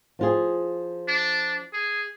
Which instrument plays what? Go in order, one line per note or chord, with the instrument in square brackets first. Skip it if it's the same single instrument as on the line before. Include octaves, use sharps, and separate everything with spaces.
[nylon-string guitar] F3 F4 G#4
[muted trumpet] D4
G#4